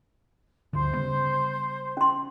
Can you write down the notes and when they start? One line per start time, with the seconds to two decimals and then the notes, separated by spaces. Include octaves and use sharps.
0.73 D2 G2 D3 C5
0.93 C#3 G3 B3
1.97 C#4 C6